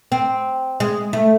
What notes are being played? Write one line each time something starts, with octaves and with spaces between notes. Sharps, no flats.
C4
G#3
A3